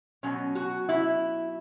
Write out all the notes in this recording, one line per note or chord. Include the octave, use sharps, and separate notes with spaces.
B2 F#3 C#4
F#4
E4